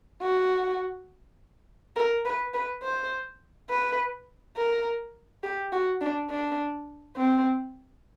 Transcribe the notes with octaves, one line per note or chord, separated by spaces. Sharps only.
F#4
A#4
B4
B4
C5
B4
A#4
G4
F#4
D4
D4
C4